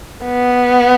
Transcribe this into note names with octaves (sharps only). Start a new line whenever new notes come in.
B3